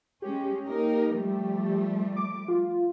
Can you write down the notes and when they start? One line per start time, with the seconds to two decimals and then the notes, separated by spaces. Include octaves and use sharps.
0.22 G#3 C#4 G4
0.66 A#3 D#4 A#4
1.16 F3 G3 A3
2.16 D6
2.48 F4